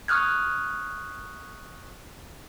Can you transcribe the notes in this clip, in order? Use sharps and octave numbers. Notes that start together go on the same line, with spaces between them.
C#6 D#6 F6 F#6 G#6